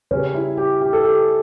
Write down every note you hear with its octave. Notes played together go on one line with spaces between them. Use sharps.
C#3 G3 C#4
E4
G4
G4
A4
G4